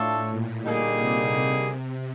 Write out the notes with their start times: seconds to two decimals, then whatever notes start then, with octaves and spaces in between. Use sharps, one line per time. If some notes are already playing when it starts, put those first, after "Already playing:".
Already playing: A2 A3 D4 F4 A4 C#5
0.31 A#2
0.65 D3 G3 A#3 D#4 G#4
0.99 C3
1.65 C3